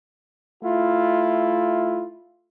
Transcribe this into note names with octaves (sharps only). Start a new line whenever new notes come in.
A3 E4 F4